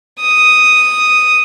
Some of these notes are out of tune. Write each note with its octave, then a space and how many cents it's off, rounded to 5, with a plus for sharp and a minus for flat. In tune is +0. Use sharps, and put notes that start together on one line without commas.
D#6 +0